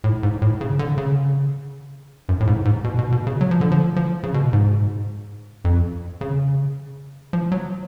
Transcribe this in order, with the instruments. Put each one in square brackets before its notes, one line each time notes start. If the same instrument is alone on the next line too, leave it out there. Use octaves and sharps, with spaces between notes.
[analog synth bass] A2
G#2
A2
C#3
D3
C#3
F#2
A2
G#2
G#2
B2
B2
B2
C#3
F#3
F3
D3
F3
F3
C#3
B2
G#2
F2
C#3
F3
F#3